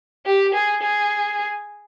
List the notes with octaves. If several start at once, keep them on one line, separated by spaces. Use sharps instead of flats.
G4
G#4
G#4